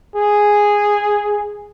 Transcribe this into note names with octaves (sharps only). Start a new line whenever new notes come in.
G#4